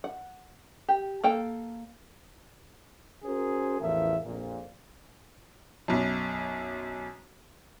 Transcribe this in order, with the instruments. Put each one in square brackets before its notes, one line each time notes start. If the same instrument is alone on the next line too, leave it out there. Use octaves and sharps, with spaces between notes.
[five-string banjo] F#5
G4
A#3 A4 G5
[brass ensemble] C#4 F#4 G#4 A#4 C5
A1 E2 F3 A#4 E5
A#1 F2 A#2
[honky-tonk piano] B1 F#2